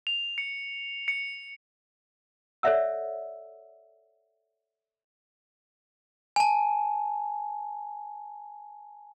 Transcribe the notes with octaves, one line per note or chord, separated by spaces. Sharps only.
F7
C#7
C#7
A4 C#5 D5 E5 F#5 E6
G#5 A5